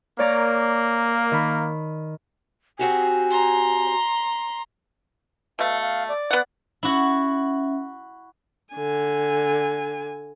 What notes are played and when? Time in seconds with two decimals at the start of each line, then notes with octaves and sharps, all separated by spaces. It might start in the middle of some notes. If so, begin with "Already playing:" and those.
0.19 A#3 C#5 D5 A#5
1.32 D#3 B5
2.79 C4 F#4 G4 G#5
3.31 A#5 C6
5.59 B2 A3 F5
5.82 F5
6.08 D5
6.31 B3 F#5
6.83 C#4 E4 F#4 E5
8.74 D3 G#5